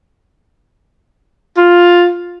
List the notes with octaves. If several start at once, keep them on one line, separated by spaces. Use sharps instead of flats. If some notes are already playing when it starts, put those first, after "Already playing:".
F4